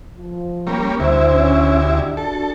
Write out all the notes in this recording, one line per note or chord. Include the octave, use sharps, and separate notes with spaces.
F3
G3 A#3 C#4
D2 E4 C5
C#4
D4 D#4 G4
D4 F#4 A4